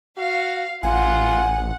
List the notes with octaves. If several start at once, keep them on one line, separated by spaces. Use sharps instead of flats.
F#4 F5
A1 F4 F#5 G#5